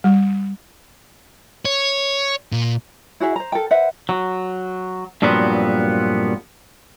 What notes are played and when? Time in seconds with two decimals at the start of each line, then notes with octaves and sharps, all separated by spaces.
0.04 G3
1.65 C#5
2.52 A#2
3.20 E4 F#4 G#4 E5
3.36 C5 A#5
3.52 A4 A#4 G5
3.71 B4 C5 E5 F#5
4.09 F#3
5.22 G2 A#2 F3 F#3 B3 C4